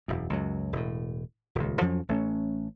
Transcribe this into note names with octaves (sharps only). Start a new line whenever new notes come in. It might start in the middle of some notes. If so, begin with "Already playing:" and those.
E1 F#2
C#2 F#2 F#3
E1 A2
D#1 C#2
F2 F3 F#3 C#4
A1 A3 C#4